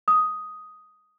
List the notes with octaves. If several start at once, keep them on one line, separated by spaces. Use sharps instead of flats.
D#6